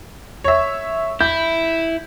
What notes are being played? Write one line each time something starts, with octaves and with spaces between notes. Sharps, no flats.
C#5 E5
E4 G6